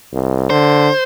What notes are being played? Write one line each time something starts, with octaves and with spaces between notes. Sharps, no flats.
C2
D3 C5